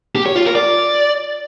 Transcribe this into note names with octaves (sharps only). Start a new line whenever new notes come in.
G4
C#5
F4
A#4
D5